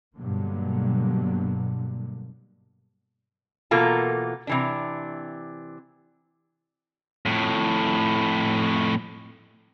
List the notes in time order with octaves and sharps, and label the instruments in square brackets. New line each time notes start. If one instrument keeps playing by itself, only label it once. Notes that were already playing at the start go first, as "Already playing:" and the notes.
[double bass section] G2 B2 D3 F#3 A#3
[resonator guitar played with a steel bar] B2 E3 A#3 F4 A4 A#4
C3 E3 D4
[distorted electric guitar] F2 A2